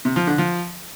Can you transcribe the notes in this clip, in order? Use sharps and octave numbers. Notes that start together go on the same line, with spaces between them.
C3
F3
D3
F3